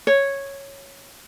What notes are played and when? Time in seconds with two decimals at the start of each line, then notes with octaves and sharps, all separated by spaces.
0.07 C#5